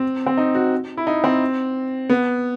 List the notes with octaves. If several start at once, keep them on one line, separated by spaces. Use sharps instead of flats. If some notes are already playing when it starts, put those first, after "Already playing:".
Already playing: C4
C4
D#4
F#4
E4
D#4
C4
B3